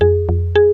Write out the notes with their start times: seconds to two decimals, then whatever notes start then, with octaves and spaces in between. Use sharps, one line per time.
0.01 F2 G#4
0.29 F2
0.55 G#4